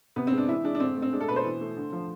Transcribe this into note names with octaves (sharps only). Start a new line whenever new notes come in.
C3 B3
C4
G#3
D4
E3 E4
G#3 D4
D4
D3 C4
A3
C4
G#3 D4
A4
B2 B4
C5
E3
A3
D3
F3